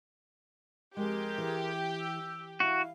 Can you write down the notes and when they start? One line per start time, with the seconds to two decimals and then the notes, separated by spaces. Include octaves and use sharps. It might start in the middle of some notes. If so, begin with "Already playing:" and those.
0.97 F2 G#3 G4 G#4 A#4 C6
1.38 E3
2.00 E6
2.60 E4 F#4 F5